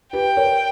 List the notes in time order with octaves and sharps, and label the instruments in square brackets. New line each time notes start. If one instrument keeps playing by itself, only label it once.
[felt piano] G4 B4 [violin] G5
[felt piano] A#4 C#5